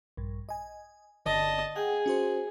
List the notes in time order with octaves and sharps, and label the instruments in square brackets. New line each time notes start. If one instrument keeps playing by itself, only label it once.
[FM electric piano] A#1 G2
D#5 G#5
[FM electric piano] G1 D3 D5 [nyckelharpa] D#5 A5
[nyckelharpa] G#4 [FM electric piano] F#5 G5
[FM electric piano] C#4 F#4 C5